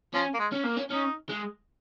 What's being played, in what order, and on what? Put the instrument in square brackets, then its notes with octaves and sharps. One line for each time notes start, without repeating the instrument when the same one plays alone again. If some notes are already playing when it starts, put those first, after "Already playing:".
[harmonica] F3 [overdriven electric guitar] C#4
[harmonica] A#3
G#3
[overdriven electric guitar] C#4
A#3
C#4
[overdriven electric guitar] C#4 [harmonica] D#4
[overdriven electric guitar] G#3